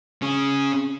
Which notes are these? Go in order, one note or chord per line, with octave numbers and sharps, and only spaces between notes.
C#3 C#4 G#4